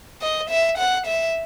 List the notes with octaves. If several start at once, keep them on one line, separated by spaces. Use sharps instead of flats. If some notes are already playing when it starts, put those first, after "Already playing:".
D#5
E5
F#5
E5